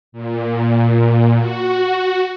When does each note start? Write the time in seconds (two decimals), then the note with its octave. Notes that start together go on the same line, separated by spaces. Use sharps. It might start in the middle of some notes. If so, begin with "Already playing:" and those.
0.12 A#2
1.38 F#4